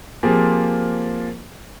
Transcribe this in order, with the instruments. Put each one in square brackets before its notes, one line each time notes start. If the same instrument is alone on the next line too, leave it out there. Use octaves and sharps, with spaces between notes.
[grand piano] F3 A#3 C4 F4 G4 G#4